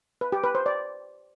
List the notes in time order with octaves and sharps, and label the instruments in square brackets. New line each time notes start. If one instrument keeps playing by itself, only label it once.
[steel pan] B4
G4
B4
C5
D5